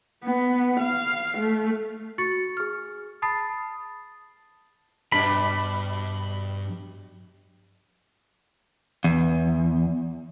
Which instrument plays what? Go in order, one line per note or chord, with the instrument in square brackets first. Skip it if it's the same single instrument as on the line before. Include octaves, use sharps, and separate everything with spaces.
[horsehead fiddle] B3
F5
A3
[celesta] F#4 C#6 A6 C#7
G#4 F6
A5 B5 D#6 A6 C7
[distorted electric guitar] G2 [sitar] B2 G3 D4 [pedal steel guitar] B5
[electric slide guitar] E2